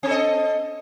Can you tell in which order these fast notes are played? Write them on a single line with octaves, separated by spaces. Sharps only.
C4 A4 D#5